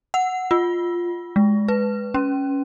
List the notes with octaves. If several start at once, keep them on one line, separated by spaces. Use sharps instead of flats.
F#5
F4
G#3
B4
C#4